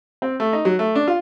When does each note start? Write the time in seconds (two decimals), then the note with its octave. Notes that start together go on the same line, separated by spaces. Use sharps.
0.22 C4
0.40 A3
0.53 D#4
0.65 F#3
0.79 A3
0.95 D4
1.08 F4